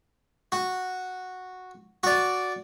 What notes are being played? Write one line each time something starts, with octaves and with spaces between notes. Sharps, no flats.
F#4
F#4 D5